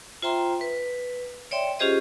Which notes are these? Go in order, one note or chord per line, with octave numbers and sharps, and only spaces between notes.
F4 C5 E5 G5 A#5 C6
B4
C#5 D5 E5 G5 C6
C#4 F4 G4 G#4 C5 D#5